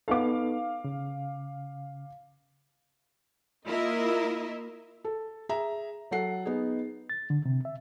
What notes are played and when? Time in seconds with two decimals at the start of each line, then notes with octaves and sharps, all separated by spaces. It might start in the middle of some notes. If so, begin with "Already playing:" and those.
0.08 B3 D#4 A4 F5 D6
0.84 C#3
3.65 A#3 E4 F4 A#4 D#5 E5
5.04 A4
5.49 G#4 E5 A#5
6.11 F#3 A4 F#5 C7
6.45 B3 D#4 G#4
7.10 A6
7.30 D3
7.46 C3
7.65 E5